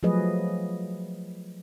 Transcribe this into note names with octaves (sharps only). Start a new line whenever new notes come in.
F3 F#3 A3 G#4 B4 D#5